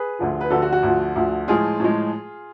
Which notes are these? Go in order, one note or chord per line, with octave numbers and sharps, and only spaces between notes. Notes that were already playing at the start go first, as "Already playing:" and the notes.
Already playing: G#4 B4
D2 D3 F3
B4
D2 D3 F3 F#4 A4
F#4
F#4
D2 D3 F3
D2 D3 F3
A2 F3 G#3 F4 G#4
A2 F3 G#3